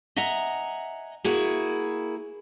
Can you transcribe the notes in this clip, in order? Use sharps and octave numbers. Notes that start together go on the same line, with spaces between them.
D#5 E5 F#5 G#5 A#5
A#3 E4 F#4 G#4